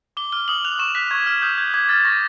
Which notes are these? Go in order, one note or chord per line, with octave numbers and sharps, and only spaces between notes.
D6 G7
F6 G7
D#6 F#7
F#6 F7
C#6 E7
F#6 B6
C#6 G#6
F6
D#6 G6
G6 G#6
D6 G#6
F6 A6
C#6 A#6